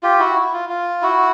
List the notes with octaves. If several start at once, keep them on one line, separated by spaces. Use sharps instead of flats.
F4 G4
E4 F#4
E4
F4
F4
E4 F#4